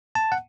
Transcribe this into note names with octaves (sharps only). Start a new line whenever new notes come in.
A5
F#5